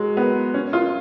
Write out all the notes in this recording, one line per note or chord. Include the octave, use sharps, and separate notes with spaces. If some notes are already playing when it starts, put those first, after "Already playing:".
Already playing: F#3 G#3
B3
C#4
F4